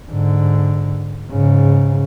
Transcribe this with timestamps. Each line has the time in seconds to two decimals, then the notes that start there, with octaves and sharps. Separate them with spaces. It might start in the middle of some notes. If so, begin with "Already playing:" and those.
0.12 G#2 D3
1.30 G#2 C#3